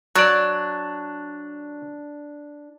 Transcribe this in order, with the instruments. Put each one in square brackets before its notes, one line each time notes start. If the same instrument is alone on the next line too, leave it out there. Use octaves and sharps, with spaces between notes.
[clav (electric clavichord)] F#3 D5 [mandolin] D4